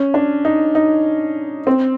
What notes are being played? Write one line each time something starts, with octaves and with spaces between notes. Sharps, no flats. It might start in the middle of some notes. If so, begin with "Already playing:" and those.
Already playing: C#4
D4
D#4
D#4
C4